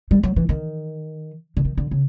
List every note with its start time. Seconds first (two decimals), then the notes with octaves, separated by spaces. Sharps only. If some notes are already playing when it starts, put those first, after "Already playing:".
0.11 G3
0.23 F#3
0.36 E3
0.49 D#3
1.57 D3
1.65 D#3
1.77 D3
1.91 C#3